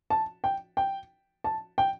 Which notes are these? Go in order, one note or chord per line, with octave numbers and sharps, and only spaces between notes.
A5
G5
G5
A5
G5